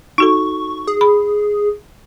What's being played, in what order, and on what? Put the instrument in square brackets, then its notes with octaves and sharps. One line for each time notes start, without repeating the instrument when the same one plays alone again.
[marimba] D#4 F#4 A4 [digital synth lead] C#6
[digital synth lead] G#4
[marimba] B5